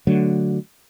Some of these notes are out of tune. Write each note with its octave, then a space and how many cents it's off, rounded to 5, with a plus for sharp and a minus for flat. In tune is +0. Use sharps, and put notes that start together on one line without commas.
D3 +0 F#3 +0 A3 +0